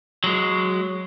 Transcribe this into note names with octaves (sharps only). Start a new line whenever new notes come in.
F#3 G#3